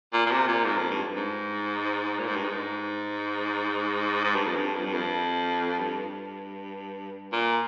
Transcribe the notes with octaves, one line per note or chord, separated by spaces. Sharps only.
A#2
A#2
C3
A#2
G#2
F2
G2
G#2
A#2
G#2
G2
G#2
G#2
G2
F2
G2
F2
G2
F2
G2
A#2